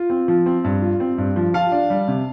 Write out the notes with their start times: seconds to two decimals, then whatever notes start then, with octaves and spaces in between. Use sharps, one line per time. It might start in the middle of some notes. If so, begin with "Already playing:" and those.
Already playing: F4
0.10 C4
0.28 F3
0.46 C4
0.64 G2
0.82 F4
1.00 C4
1.18 G2
1.36 F3
1.54 F4 F5 A5
1.72 D4
1.90 G3
2.08 C3